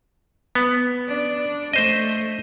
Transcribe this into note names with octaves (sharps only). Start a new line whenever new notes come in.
B3
D4
A3 C5 D#5